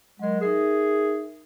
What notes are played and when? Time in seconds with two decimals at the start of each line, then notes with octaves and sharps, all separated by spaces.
0.19 F#3 G#3 A#4
0.41 D#4 G#4 A#4 E5